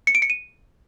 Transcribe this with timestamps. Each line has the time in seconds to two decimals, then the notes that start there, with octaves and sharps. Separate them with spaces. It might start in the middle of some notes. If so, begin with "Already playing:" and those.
0.07 C#7
0.15 D7
0.22 C#7
0.30 D#7